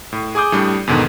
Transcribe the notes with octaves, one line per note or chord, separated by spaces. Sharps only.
A2
G#4 G#5 D6 D#6 G6
A2 G3 D4
E2 G#2 B2 D3 D#3